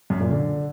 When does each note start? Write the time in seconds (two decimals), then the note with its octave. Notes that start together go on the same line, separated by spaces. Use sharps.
0.10 F#2
0.20 A#2
0.31 D3